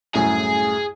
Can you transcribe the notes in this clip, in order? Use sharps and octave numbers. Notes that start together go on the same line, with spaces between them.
C2 F#2 A2 G#4